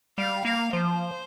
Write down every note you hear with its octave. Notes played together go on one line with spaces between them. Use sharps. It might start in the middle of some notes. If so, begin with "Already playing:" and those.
G3 F5
A#3 F5
F3 C5